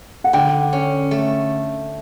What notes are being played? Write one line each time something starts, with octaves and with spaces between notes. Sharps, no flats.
F#5
D3 G5
C#4
A3